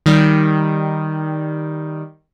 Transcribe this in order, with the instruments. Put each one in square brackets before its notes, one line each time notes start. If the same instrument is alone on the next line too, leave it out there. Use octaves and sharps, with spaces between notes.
[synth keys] D#3 G3